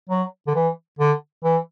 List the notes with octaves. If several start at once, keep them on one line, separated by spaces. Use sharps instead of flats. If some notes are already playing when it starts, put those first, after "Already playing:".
F#3
D3
E3
D3
E3